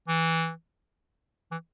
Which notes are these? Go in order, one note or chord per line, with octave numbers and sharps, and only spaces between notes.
E3
E3